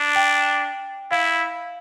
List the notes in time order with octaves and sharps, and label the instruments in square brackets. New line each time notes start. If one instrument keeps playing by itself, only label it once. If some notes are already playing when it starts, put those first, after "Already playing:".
Already playing: [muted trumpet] D4
[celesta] G5
[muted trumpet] E4 [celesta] F5